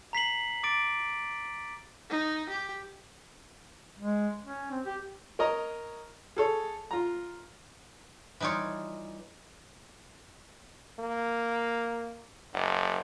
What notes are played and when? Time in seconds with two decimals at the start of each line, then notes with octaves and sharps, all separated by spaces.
0.13 A#5 B6 C7 F#7
0.63 D6 A6 D7
2.10 D#4
2.49 G4
3.99 G#3
4.45 C#4
4.71 C4
4.86 G4
5.39 A#4 C#5 D#5 A#5
6.36 G#4 A4 C#5
6.91 F4 A#5
8.40 E3 G3 D#4 F4 C#5
10.99 A#3
12.53 F#1